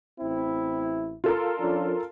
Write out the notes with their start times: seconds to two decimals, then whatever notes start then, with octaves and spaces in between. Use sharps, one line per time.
0.20 A1 C4 E4
1.24 F4 A4 A#4
1.59 F3 C#4 D4